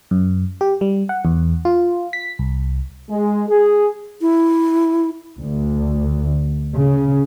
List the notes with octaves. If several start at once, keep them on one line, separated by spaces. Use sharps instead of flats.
F#2
G4
G3
F#5
E2
F4
B6
C2
G#3
G#4
E4
D2
C#3